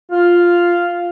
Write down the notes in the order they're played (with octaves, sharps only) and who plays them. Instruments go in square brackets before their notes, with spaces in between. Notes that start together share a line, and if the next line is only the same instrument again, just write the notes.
[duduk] F4